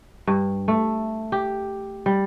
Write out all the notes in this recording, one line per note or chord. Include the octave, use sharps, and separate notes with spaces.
G2
A3
G4
G3